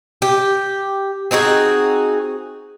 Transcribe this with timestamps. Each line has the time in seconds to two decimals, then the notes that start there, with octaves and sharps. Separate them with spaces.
0.22 G4
1.31 C4 D#4 F#4 G#4